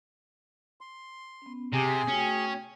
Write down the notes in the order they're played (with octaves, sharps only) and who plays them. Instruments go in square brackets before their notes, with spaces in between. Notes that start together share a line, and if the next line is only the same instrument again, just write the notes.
[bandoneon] C6
[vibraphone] B3 C#4
[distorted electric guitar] C3 [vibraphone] G4 D6 [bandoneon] G#4 G#5
[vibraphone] A3 F#4 G5 [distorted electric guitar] C#4